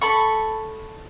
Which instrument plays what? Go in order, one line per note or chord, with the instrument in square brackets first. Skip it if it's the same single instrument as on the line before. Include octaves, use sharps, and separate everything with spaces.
[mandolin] A4 B5 C#6